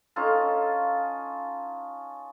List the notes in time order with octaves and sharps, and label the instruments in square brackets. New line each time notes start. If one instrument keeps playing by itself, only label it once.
[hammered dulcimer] C#4 D#4 F4 A4